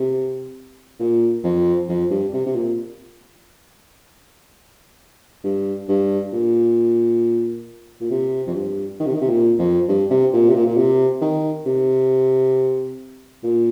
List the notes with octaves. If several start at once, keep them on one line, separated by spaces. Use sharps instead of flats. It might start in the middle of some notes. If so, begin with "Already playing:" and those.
Already playing: C3
A#2
F2
F2
G2
C3
C3
A#2
G2
G2
A#2
A#2
C3
F2
G2
D#3
C3
D#3
C3
A#2
F2
G2
C3
A#2
C3
A#2
A#2
C3
D#3
C3
A#2